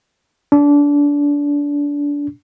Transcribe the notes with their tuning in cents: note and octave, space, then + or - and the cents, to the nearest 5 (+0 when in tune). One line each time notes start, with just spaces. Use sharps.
D4 -25